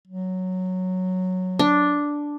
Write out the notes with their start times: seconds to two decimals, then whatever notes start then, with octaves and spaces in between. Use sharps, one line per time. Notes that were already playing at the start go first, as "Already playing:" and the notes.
0.07 F#3
1.59 D4